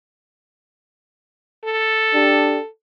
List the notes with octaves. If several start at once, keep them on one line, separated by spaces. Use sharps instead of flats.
A4
D4 G4